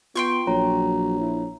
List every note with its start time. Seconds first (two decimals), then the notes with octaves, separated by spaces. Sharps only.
0.15 B3 F4 G5 C6 C#6
0.47 A#1 F#3 C#5 A#5
1.20 E4